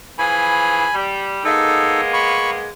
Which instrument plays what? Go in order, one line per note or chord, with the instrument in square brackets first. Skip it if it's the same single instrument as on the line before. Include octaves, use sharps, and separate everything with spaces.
[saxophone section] E3 F3 G#4 [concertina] G#5 B5
[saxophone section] G3
[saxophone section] G#3 A#3 B3 [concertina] D#4 A4
[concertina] B5 C#6